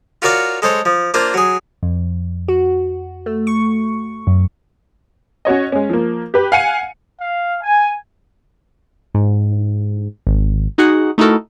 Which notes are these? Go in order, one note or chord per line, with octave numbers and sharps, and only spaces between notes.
F4 F#4 A#4 C#5 D5 F5
G#3 A4 C5 C#5
F3
A#3 D4 F4 C5
F#3 G#4
F2
F#4
A3
C#6
F#2
C#4 F#4 C#5 D#5
G#3 C#4
F3 A#3
G4 B4
F5 F#5 G#5 C#7 D#7
F5
G#5
G#2
G#1
D#4 F#4 G#4 F#5
A3 D#4 E4 F#4 A4 A#4